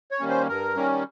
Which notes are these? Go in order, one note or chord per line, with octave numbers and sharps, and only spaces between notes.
C#5
D#3 G3 A#3 C#4
C5
G2 A#4
D#3 G3 A#3 C#4